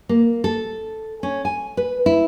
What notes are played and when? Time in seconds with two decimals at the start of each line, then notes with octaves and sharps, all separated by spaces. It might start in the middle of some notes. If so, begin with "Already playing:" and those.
0.09 A#3
0.44 A4
1.23 C#4
1.45 G#5
1.77 B4
2.06 E4